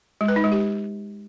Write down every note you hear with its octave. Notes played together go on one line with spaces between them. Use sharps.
G#3
B4
D#4
G#3
G4